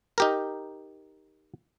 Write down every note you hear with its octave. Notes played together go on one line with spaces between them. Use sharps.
D#4 G4 A#4